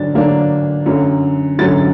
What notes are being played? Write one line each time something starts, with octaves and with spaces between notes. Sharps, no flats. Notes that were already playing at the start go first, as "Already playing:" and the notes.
Already playing: D3 F#3 D4 A6
D3 F#3 A#3 D4
F#2 D3 F#3
F#2 D3 F#3 A6